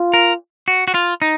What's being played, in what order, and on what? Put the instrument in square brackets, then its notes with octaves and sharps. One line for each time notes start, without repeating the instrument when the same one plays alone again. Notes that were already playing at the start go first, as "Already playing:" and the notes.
Already playing: [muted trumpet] F4
[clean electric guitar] A#4
F#4
F#4
F4
D#4